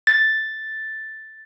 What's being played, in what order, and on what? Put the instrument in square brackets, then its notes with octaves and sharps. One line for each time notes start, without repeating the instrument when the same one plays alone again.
[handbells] A6